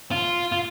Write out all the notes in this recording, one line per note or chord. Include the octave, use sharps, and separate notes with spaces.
F4
F4